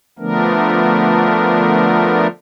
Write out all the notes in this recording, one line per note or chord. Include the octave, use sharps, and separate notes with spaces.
D3 F3 A3 B3 D4 A#4